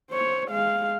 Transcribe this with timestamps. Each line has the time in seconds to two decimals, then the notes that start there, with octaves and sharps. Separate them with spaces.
0.11 C5 C#5
0.49 G#3 F5